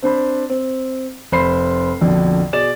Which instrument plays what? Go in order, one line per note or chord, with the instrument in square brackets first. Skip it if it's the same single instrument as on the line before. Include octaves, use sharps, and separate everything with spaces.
[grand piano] C4 D4 C5 B5
C4
F1 C5 B5 C6 C7
A#1 F2 B2 D3
B2 G#4 D5 A6 E7